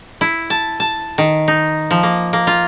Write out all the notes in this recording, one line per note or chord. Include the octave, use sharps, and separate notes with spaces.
E4
A5
A5
D#3
D#4
F3
A#3
A#3
F4